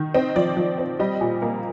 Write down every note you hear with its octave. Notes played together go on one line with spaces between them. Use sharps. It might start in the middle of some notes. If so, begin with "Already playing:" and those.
Already playing: D#3
C4 D#5
F3 D5
F3
C4
G3 D#5
A#2
A#3